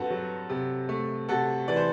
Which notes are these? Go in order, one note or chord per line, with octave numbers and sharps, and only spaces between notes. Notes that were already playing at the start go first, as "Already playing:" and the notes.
Already playing: G2 C4 F#4 A4 B4
F#3
C3
A3
C3 F#4 A4
E3 D5
C5